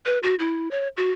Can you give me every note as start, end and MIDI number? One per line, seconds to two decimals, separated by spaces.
0.06 0.18 71
0.23 0.35 66
0.39 0.68 64
0.71 0.88 73
0.97 1.12 66